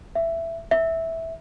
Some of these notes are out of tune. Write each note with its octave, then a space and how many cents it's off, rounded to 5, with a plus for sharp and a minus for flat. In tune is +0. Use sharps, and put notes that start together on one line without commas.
E5 +10
E5 -10